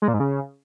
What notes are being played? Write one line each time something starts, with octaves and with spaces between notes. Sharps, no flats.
G#3
A#2
G#2
C#3